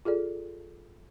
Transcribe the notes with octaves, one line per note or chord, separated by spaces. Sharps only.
F4 G#4 A4 D5